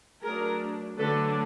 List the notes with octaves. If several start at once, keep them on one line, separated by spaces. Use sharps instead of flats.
F#3 A3 D4 G#4 A#4
D3 F#3 A3 D4 A4 B4